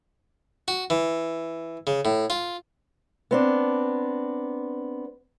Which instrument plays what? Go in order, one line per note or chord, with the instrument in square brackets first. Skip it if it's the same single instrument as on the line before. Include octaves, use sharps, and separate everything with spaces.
[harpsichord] F#4
E3
C#3
A2
F4
[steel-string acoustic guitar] B3 C4 D4